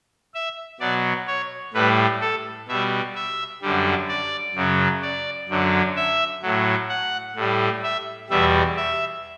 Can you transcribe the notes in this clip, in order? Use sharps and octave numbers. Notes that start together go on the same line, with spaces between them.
E5
B2 F#3 D5
C#5
A2 G3 B4
A4
B2 G3 E5
E5
F#2 D3 G3
D5
F#2 C#3 F#3
D5
F#2 D3 F#3
E5
A2 F#3
F#5
A2 G3
E5
E2 B2 G3 E5
E5